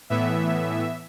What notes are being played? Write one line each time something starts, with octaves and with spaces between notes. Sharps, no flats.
A2 E3 B3 E5